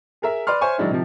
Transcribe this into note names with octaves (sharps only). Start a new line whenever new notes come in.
G#4 A#4 E5
B4 D5 C6 F6
C5 C#5 E5 G#5 C#6
D#3 F#3 G#3 D4 E4
C3 D#3 F3